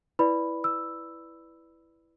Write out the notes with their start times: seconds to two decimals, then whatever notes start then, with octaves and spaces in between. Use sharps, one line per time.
0.19 E4 B4 D5 B5
0.64 E6